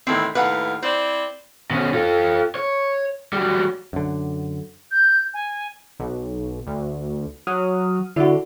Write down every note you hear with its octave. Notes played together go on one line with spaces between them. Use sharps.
E2 A2 D#3 C4 E4
D#2 A2 B4 F5 F#5
C4 E4 C5 D5
B2 C#4
F4 A4
C#5
F#3 G3
F#2 D3
G6
G#5
B1
D2
F#3 D#6 F6
D3 E4 F#4